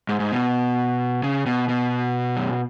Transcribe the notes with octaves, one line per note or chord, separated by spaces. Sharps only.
G#2
G#2
B2
C#3
B2
B2
F#2